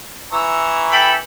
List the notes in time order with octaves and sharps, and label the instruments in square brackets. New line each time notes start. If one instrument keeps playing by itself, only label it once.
[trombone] E3 [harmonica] A#5 C#6 E6
[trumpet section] A4 G5 B5